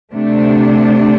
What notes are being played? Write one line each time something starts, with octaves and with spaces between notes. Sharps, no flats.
C3 A3 D4